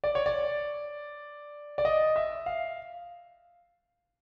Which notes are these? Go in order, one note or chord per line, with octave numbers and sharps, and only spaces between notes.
D5
C#5
D5
D5
D#5
E5
F5